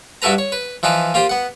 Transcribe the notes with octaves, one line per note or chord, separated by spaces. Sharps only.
G2 E4 F#4 A4 B4 A#5
C#5
B4
E3 F3 D#4 B4 D6
A#3 F4 G4 C5
B3 F#5